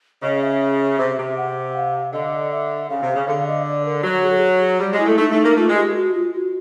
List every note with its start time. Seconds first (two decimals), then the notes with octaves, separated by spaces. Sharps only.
0.22 C#3 D#5
0.42 E5
0.99 C3
1.18 C3
1.37 F#5
1.76 F5
2.13 D3 D#5
2.52 E5
2.90 C#3 F5
3.02 C3
3.15 C#3
3.28 D3 F5
3.47 D#5
3.65 D5
3.85 A#4
4.04 F#3
4.23 G#4
4.30 A4
4.37 G#4
4.80 G3 G4
4.93 G#3
5.00 E4
5.06 A3
5.18 A3 D#4
5.32 A3 D#4
5.44 A#3
5.56 A3 F4
5.69 G#3
5.75 G4
5.95 F#4
6.14 F4
6.33 F#4